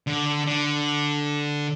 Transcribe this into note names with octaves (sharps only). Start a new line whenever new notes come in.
D3
D3